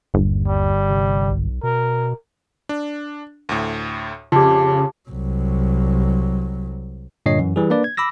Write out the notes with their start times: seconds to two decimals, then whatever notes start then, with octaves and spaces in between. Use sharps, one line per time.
0.14 G1 D#2
0.48 G3
0.89 C3
1.30 B1
1.63 B2 A#4
2.69 D4
3.49 D2 A2
4.32 F2 C#3 F4 G4 A5 D6
5.09 C2 F#3
7.26 G2 A#2 D3 C#5 D#5 C7
7.38 F#2 E3
7.56 E3 G3 G#4
7.70 A#3 D4 B4 D5
7.84 G#6
7.97 B5 D6 E6 A#6